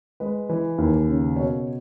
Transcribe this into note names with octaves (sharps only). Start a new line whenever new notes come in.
G#3 B4
E3
D#2
C#3
B2 C#5